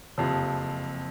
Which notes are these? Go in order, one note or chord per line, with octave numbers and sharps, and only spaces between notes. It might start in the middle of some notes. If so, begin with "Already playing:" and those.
F#1 F2 C3 F3